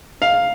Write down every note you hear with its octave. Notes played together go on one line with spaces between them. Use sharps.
F5